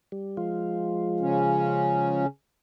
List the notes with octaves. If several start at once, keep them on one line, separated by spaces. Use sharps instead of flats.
G3
F3 G#3 F4
C#3 C#4